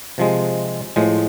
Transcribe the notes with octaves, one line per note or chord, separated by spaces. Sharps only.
C3 F3 G#3
A2 F3 G#3